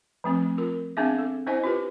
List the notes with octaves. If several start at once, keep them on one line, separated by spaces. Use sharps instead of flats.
F3 A3 C4
F4 A#4
B3 C4 D4 G#4 E5
A4
C#4 E4 C5 D#5 G#5
F4 G4 B4